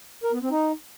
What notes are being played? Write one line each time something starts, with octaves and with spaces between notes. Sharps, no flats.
A#4
B3
C4
D#4